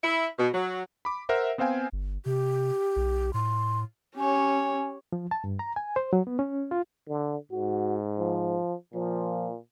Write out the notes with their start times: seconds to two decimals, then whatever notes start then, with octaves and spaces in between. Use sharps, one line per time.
0.04 E4
0.39 B2
0.53 F#3
1.05 B5 D6
1.29 A#4 C5 E5 F#5
1.58 B3 C4 C5 F5 G5 G#5
1.92 G1
2.26 C3 G4
2.96 B1
3.34 A2 C6
4.17 C#4 G4 C#5 G#5
5.12 F3
5.31 A5
5.44 G2
5.59 A#5
5.76 G#5
5.96 C5
6.13 F#3
6.27 B3
6.39 C#4
6.71 F4
7.08 D3
7.52 G#2 F#4
8.19 F3
8.94 A#2 F3